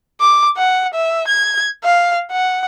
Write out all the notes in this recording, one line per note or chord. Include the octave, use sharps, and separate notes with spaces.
D6
F#5
E5
G#6
F5
F#5